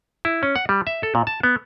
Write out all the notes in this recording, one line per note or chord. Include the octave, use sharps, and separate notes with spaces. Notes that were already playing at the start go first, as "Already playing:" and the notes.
E4
C#4
F#5
G3
E5
A4
A#2
A5
B3